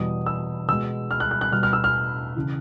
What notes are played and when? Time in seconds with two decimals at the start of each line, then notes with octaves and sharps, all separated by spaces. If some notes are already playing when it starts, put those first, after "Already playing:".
Already playing: E2 B2 G3 D#6
0.26 E6
0.68 B2 G#3 E6
1.11 F6
1.20 F#6
1.31 F#6
1.41 F#6
1.52 B2 G3 F6
1.63 F6
1.73 E6
1.84 F6
2.36 C#3 E3